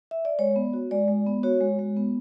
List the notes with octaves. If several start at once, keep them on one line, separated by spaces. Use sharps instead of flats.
E5
D5
G#3 C#5
B3
F#4
G#3 D5
G#3
B3
F#4 C#5
G#3
G#3
B3